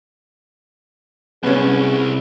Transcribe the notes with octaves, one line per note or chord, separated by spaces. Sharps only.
C2 B3 C#4 G#4